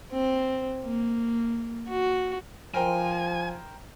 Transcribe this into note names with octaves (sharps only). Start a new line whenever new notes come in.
C4
A#3
F#4
F3 A#4 C5 G5 G#5